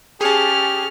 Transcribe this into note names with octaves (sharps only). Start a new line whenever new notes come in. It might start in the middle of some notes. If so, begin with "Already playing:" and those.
C#4 G4 G#4 A5 F6